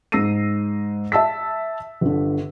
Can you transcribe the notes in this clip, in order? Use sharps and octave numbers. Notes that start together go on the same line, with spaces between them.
G#2 E6 A#6 C7 D#7
E5 A5 E6 B6
G1 D3